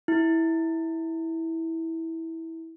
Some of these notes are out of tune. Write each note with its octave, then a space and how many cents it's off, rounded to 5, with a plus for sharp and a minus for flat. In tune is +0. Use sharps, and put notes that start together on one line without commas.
E4 -15